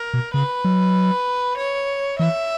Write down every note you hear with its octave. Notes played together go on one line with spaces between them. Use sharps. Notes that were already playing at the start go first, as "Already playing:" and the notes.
Already playing: A#4
B2
C#3 B4
F#3
C#5
E3 E5